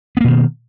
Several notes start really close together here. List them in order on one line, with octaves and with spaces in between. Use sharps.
B3 A#3 B2 D#3